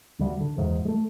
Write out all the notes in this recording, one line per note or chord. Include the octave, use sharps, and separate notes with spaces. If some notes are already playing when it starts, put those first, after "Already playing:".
D2 G3
D3
F#1 E2 G#2
G#3 A3